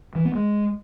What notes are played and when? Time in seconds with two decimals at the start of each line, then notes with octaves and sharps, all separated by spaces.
0.15 E3
0.25 B3
0.35 G#3